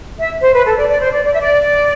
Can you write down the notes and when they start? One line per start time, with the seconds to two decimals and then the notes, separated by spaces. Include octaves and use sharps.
0.19 E5
0.42 C5
0.54 B4
0.66 A4
0.77 D5
0.89 D5
1.01 C5
1.12 D5
1.24 D5
1.32 E5
1.40 D5